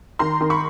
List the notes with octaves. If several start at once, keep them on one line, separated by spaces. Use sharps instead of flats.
D#3 A#5 C6
D#3
B5 C#6